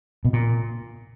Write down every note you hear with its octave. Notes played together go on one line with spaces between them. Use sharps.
B2
A#2